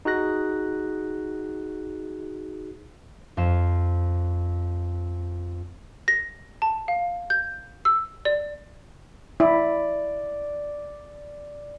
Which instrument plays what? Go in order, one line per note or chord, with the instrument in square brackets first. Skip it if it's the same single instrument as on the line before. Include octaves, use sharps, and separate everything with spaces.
[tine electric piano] D#4 F#4 G#4 F#6 A#6
[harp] F2 F5 E7
[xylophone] A#6
A5
F5
G6
E6
D5
[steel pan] E4 [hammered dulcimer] D5